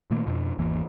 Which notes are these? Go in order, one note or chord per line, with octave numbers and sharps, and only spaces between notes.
A#2 D#3 A3 A#3
F2 B2
G#1 E2 E3 A#3